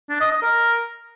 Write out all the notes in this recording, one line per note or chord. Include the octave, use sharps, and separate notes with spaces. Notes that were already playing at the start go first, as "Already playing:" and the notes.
D4
D#5
D#5
A#4